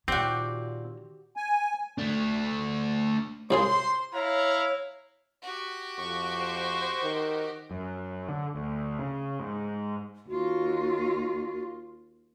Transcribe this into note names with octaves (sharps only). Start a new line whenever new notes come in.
A#2 D#3 C4 F#4 G4
G#5
A3 D4
C2 C#3 G#4 C5 C6
E4 C#5 F5 A#5
F#4 G4
F2 C#6
C5
D#3
F#2
D3
D2
C#3
G#2
D#2 F4 F#4